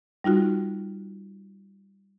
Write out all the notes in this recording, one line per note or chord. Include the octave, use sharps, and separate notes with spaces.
G3 D#4 F4 F#4